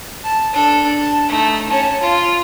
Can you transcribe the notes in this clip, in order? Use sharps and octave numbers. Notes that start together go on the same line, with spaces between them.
A5
D4 A4
A5
A3 D#4
C#4 A5
F4